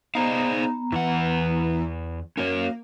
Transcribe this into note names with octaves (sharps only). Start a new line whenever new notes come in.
B3 D#4 G#4 C5 F5 A#5
E2 E3 F#5
A#3 C#4 F#4 C#5